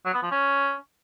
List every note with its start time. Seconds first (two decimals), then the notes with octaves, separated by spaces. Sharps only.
0.05 F#3
0.14 B3
0.23 F3
0.31 C#4